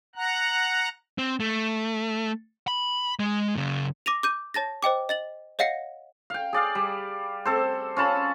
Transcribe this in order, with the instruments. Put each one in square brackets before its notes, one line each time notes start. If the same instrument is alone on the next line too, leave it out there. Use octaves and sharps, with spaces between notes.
[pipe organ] F#5 A#5 F#6
[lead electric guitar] C4
A3
B5
G#3
F#2 C#3
[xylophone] D6 A#6 D#7 F7
D6 G6 D#7
C#5 A5 A6 A#6
C5 D#5 G5 D6
D#5 A6 F#7
C#5 D#5 F5 F#5 A#6 C#7
[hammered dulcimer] F5 G5
G#4 D5 F5
G3
C4 A4 C5
C#4 F4 A5 B5